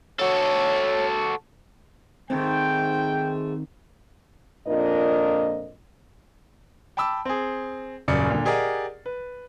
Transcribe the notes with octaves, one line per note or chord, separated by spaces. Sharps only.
F#4 A4 C#5
G#2 D#3 A3 C4 G5
F2 A#2 D4 A#4 D#5
G5 A5 B5 D6 E6
C4 G#4
D#1 F#2 C#3 D5 C#7
A#2 D3
G4 G#4 A#4 D5 D#5 F#5
B4